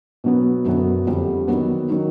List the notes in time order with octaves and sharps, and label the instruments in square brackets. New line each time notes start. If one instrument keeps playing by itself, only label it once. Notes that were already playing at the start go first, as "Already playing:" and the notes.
[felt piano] B2 F#3 B3
F#2 D3 F#3 B3
F2 D3 G3
D#3 F#3 B3
D#3 F#3